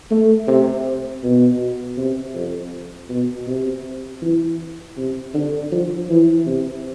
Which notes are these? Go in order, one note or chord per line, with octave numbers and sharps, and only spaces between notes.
A3
C3
B2
C3
F2
B2
C3
E3
C3
D3
F3
E3
C3